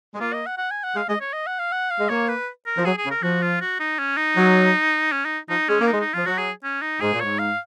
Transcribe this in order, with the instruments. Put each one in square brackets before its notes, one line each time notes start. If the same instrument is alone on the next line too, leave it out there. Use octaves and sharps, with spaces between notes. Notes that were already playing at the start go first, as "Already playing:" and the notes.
[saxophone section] G#3
[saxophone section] A#3 [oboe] F4
[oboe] D#5
F#5
F#5
G#5
F#5
[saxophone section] G#3 [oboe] F5
[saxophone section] G#3 [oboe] D#5
[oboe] C#5
D#5
F#5
F5
F#5
F5
[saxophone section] G#3
[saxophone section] A#3 [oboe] C#5
[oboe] B4
A#4
[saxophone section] F3
[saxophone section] F#3 [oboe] G#4
[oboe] G#4
[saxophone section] C#3
[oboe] A#4
[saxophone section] F3 [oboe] F#4
[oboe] F4
F#4
D#4
C#4
D#4
[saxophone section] F#3
[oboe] C#4
D#4
[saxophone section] F3 [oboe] D#4
[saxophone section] G#3 [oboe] C#4
[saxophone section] A#3
[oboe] D#4
[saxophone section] G#3
[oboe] D#4
[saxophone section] F3 [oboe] F4
[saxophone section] F#3 [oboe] F#4
[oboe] G#4
C#4
D#4
[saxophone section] G#2 [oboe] G#4
[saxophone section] A#2
[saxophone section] G#2 [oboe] C#5
[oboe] F5